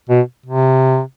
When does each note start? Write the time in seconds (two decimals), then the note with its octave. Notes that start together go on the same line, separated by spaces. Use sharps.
0.10 B2
0.46 C3